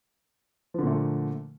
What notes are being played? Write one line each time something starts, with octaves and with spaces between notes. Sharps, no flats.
A#2 D3 F3 A3